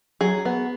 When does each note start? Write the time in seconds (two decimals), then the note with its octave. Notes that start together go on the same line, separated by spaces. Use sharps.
0.21 F#3 G#4
0.45 B3